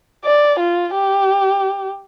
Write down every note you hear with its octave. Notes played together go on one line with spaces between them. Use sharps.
D5
F4
G4